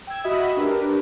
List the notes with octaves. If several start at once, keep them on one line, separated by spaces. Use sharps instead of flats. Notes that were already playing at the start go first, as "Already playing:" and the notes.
G5 E6 G#6
F#4 D#5 E5 B5 D#6 E6
D4 G4 A#4 B4